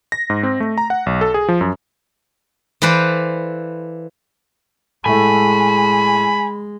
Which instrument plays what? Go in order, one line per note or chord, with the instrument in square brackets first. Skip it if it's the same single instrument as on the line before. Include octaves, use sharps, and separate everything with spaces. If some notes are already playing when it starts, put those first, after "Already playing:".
[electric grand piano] A#6
G#2
C4
A3
A#5
F#5
B1
A4
G#4
F3
F#2
[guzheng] E3 A4 B4 C5 D5 F5
[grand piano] A2 A3 [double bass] G#3 [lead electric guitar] G#5 [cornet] B5